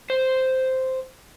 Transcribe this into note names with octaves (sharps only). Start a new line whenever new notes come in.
C5